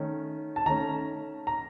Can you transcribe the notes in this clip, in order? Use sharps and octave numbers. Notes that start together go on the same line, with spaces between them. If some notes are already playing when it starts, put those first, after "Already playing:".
Already playing: D#3 A3 C#4
A5
D#3 A3 C#4 A#5
A#5